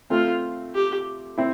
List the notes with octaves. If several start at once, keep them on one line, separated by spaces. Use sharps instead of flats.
A3 C4 F4
G4
C4 E4